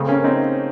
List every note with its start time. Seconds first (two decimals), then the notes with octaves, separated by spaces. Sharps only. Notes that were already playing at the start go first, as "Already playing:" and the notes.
Already playing: C#3 A3 C4
0.08 A#3 C#4
0.24 C4 D#4